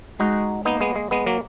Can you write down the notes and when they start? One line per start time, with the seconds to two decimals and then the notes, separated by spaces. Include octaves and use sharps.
0.19 G#3 D#4 F#4
0.65 A#3 B3 D#4
0.81 G#3 B3
0.96 G#3
1.11 G#3 B3
1.26 F#3 A#3